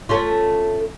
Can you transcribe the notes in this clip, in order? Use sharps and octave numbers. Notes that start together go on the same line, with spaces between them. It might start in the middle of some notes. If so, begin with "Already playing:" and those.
A3 C#4 F4